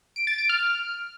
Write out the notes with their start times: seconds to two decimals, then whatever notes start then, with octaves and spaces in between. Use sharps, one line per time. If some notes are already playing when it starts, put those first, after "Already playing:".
0.16 D7
0.27 A6
0.38 D7
0.49 F6